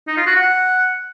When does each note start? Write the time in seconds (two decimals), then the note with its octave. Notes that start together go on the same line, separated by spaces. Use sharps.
0.08 D#4
0.17 F4
0.27 F#4
0.36 F#5